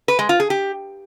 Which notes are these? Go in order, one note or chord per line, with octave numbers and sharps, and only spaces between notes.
B4
G#3
F4
G#4
G4